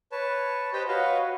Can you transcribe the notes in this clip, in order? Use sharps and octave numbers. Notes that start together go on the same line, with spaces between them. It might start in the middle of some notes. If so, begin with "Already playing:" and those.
B4 C#5 A5
G4 B4 C5 D#5 G5
F#4 B4 C#5 D#5 F5